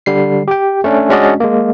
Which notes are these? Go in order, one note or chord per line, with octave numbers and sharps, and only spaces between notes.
D3 G3 C7
G4 G5
A3 C#4 D4
G#3 C#4 D4 F#4 D5 D#5
G#3 A#3